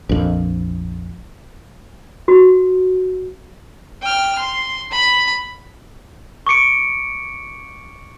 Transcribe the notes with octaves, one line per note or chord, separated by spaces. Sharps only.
A#1 F2
F#4
G5 F6
C6
B5
C#6 D6 C#7 D7